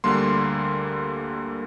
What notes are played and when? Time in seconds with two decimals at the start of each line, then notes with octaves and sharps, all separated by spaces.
0.04 D2 D3 G3 A#3 C6